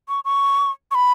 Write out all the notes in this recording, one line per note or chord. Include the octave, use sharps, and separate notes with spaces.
C#6
C#6
C#6
B5